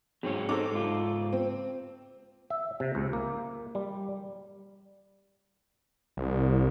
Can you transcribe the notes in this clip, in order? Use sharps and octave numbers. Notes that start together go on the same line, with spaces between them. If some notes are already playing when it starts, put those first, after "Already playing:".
G#2 F#3 C4 C#5
D#4 A4 B4 C5 D6
G#2 F4
C4
E5
C3
C#2
A#3
G3
C2